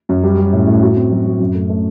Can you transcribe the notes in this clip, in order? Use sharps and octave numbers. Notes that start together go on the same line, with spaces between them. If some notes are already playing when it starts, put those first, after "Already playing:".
F#2
G3
G3
A2
A2
F#4
C4
F#3
F#3
F#2
A3
A3